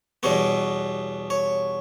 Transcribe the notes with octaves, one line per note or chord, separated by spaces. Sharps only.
E2 B2 G3 B3 C#5
C#5